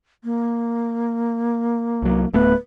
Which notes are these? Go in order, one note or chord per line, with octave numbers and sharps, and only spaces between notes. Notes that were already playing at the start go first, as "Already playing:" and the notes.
A#3
C2 F#3
D1 A3 B3 B4